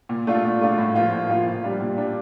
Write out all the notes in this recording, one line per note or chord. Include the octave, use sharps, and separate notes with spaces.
A#2
A3 D4 F4
A#2
A3 D4 F4
A2
F3 A#3 F4
A2
F3 A#3 F4
A#2
G3 D4
A#2
G3 D4